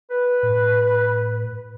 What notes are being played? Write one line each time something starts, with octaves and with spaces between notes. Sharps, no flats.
B4
A2